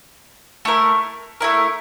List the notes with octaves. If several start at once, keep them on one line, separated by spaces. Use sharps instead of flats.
A3 E4 A#4
A3 E4 A#4